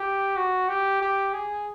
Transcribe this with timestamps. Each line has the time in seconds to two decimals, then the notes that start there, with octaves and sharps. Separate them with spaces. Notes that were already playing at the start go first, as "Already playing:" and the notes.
Already playing: G4
0.36 F#4
0.69 G4
1.01 G4
1.33 G#4